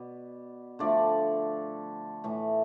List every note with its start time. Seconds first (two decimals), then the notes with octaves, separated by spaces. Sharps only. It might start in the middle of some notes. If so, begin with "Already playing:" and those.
Already playing: B2 B3 D5
0.79 D3 F3 A3 D5
2.24 A2 E3 A3